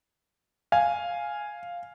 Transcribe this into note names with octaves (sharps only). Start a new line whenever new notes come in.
F5 G#5